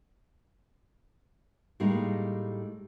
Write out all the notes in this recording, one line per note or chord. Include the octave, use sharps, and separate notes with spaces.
A2 G3 G#3 A#3 D#4